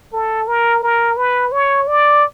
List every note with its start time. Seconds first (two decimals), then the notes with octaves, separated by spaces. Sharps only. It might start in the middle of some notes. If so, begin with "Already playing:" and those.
0.13 A4
0.48 A#4
0.83 A#4
1.17 B4
1.52 C#5
1.87 D5